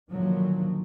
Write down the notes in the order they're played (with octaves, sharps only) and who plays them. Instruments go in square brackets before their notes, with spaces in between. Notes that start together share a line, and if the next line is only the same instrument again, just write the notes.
[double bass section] G2 A#2 D3 D#3 F3 F#3